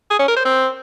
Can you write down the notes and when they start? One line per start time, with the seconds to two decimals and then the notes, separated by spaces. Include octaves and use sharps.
0.11 G#4
0.19 C#4
0.28 A#4
0.37 C5
0.45 C4